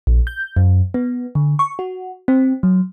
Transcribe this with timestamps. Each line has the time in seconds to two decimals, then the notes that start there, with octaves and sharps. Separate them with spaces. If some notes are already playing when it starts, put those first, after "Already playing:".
0.07 A#1
0.27 G6
0.57 F#2
0.94 B3
1.35 D3
1.59 C#6
1.79 F#4
2.28 C4
2.63 F#3